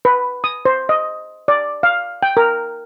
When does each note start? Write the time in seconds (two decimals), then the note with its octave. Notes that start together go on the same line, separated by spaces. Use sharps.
0.05 B4
0.44 D#6
0.65 C5
0.89 D#5
1.48 D5
1.83 F5
2.23 G5
2.37 A#4